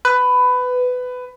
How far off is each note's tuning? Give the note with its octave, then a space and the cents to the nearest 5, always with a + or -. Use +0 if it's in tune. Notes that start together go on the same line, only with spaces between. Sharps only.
B4 +15